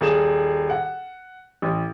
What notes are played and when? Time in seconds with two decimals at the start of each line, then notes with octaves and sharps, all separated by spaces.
0.01 D#1 G#4 E7
0.70 F#5
1.62 A1